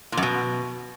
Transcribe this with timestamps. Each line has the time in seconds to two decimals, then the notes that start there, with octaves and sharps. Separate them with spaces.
0.12 A#2
0.17 F#2
0.23 B2